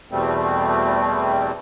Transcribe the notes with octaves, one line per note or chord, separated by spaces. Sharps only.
E2 B2 G3 A3 C4